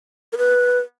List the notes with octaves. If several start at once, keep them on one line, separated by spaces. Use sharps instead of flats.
A#4
B4